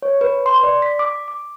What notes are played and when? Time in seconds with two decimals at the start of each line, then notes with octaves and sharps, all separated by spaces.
0.02 C#5
0.21 B4
0.46 C6
0.63 D5
0.82 B6
0.99 D6
1.28 D6